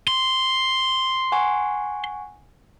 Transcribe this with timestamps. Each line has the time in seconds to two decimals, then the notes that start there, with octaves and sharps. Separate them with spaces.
0.08 C6
1.32 F#5 G#5 C#6